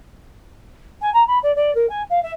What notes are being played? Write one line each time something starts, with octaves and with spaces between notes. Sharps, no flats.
G#5
A#5
B5
D5
D5
A#4
G#5
F5
E5